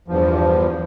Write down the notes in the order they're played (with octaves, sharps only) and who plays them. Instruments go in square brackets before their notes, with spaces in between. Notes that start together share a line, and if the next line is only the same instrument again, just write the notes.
[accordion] E2 G2 F3